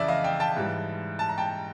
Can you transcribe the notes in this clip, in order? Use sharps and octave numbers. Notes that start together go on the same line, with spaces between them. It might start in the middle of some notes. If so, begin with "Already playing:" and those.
Already playing: F2 C#3 E3 D5 E5
D#5 F5
F5 G5
G5 A5
G#2 E3 G3
A5
A#5
G5 A5